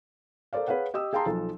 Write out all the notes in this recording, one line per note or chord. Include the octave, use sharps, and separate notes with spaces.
A4 A#4 C5 D5 F5
G#4 B4 C#5 F5 F#5
G4 D#5 D#6 E6
G#4 F5 G5 A5 A#5 C6
B1 F3 A4